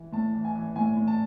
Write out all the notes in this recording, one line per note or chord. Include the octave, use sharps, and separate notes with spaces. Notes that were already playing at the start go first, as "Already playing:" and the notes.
Already playing: E3
A2 A5
E3
G#5
E3
A2 G#5
A2
A5